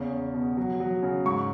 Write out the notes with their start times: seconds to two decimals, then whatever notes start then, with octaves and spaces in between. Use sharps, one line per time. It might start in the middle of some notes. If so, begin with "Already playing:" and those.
Already playing: E2 C#3
0.11 E2
0.34 B2
0.57 F#3
0.80 F#3
1.03 C#3
1.26 G#2 C#6